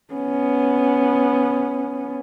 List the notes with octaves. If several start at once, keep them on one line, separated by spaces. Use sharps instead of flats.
B3 C#4